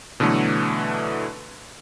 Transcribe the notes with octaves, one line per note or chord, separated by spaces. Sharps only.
B2 D3 E3 F#3 A3